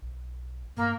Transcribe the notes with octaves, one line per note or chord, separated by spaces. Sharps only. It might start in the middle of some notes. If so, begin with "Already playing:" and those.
B1
G2 A#3